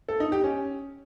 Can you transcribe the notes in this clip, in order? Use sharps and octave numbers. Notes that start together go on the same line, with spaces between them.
A4
D#4
G4
C#4